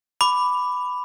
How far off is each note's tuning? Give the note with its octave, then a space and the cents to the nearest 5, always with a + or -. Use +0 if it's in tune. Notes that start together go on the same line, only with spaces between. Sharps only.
B5 +10 D6 +0